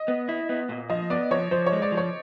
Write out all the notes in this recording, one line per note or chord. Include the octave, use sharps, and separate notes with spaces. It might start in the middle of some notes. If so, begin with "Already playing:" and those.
Already playing: D#5
B3
E4
B3
A#2
F3 D#5
B3 D5
F3 C#5
F3 C5
C#5
G#3
D5
F3
C#5